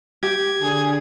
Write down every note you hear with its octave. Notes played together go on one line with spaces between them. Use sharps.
G4 G#6
D3 G#4